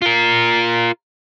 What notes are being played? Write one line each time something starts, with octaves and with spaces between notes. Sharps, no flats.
F4 A#4